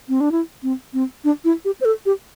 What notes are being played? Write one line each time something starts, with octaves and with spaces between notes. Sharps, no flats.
C4
D4
E4
C4
C4
D4
E4
G4
C5
A4
G4